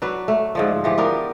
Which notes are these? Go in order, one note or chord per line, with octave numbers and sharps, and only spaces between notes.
F#3 D4 B4
A3
G#2 D3 F3
E3 F3 G4
B3 D4 A#4